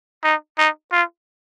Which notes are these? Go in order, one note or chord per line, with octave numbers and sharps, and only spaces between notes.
D#4
D#4
F4